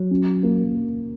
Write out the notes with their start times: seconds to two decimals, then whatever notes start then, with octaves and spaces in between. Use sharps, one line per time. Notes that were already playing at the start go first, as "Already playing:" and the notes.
Already playing: F#3
0.11 C#4
0.43 A#3